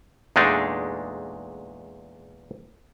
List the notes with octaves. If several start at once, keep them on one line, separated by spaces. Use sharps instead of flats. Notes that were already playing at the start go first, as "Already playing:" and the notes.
E2 A#2 G#3 A3 D4 D#4